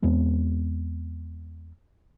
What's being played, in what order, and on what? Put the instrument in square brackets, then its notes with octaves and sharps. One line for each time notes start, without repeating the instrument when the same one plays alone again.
[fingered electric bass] E2 G#3 B3 C4